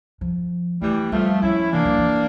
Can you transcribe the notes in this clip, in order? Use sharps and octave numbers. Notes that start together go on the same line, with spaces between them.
F3
E3 G3 A3
F3 G3 A3
F3 C#4 E4
E3 A#3 D4
F3
E3